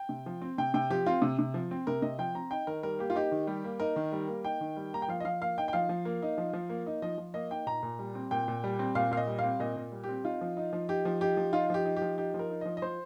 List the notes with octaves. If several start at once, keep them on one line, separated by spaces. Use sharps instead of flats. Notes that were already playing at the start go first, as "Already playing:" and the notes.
Already playing: G5
C3
F3
C4
C3 G5
C3 G5
F3 G4
C4 F4
C3
C3
F3
C4
C3 A#4
C3 D#5
F3 G5
C4 A#5
D#4 G5
D#3 A#4
G3 A#4
A#3 G4
F4
D#4 G4
D#3
G3
A#3
D#4 A#4
D#3
G3
A#3
D#4 G5
D#3
G3
A#3 A#5
G5
F3 F5
D#5
F3 F5
A#3 F5
D#4 G5
G5
F3 F5
F3
A#3
D#4
F3
F3
A#3
D#4
F3 D#5
F3
A#3 D#5
D#4 G5
A#2 A#5
A#2
G3
C4
A#2 G5
A#2
G3
C4
A#2 F5
A#2 F5
D#5
G3
C4 F5
A#2 D#5
A#2
G3
G4
C4
D#4 F4
F3
D#4
F3
D#4 G4
F3
D#4 G4
F3
D#4 F4
F3 G4
D#4
G4
F3
D#4 G4
F3
A#4
D#4
F3 D#5
D#5
F3 C5